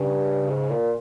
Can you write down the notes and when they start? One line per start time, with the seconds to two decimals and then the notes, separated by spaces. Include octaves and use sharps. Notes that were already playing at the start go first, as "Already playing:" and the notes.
Already playing: G2 C#3
0.50 G#2
0.70 A#2